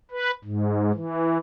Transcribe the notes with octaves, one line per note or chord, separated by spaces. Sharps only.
B4
G#2
E3